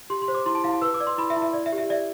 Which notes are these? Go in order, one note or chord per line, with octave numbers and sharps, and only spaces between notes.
G4 C6
C6
C5
D6
E4 C6
A5
E4 F5
A5
B4 E6
D6
D5
C6
E4 B5
E5
E4
E5
D5
E5
G4
E5
D5 E5